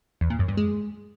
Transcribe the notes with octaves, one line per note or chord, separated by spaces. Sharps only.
E2
A#2
F#2
G2
G#3